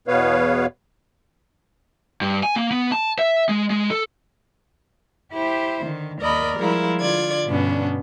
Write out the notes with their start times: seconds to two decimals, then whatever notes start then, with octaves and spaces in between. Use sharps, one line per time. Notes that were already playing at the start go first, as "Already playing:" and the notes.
0.08 E2 B2 B3 B4 C#5 F5
2.21 G2
2.43 G#5
2.56 A#3
2.71 B3
2.92 A5
3.19 E5
3.49 G#3
3.70 G#3
3.91 A4
5.33 E4 G4 C5
5.84 D3 D#3
6.21 D#2 A#4 D5 D#5 B5
6.58 F3 G3 G#3 E4 F4 A#4
7.00 D3 F4 D5 G#6
7.46 G2 B2 D3 B3 C#4 D4